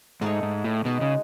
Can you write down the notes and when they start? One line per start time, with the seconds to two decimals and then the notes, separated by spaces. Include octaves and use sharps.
0.21 G#2 A3 D#4 G#4 C#5
0.43 G#2
0.64 A2
0.85 B2 G#3 D#4 F#4
1.01 C#3